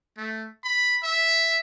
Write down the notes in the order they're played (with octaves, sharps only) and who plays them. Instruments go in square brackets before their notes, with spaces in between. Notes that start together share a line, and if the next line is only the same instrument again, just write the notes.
[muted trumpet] A3
B5
E5